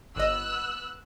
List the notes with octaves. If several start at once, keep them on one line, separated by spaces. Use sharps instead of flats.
G1 B3 D#5 E6 F#6